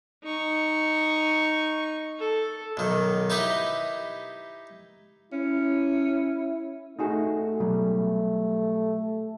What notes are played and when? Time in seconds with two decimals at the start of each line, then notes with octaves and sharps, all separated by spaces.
0.24 D#4 C#6
2.20 A4
2.77 B1 D#3
3.30 D#4 E4 G4 B4 D#5
5.32 C#4 E4
6.99 A3 D#4 F#4 G#4
7.60 B2 F#3 G3